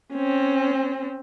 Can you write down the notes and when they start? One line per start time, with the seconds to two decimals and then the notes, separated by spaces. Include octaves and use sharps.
0.14 C4 C#4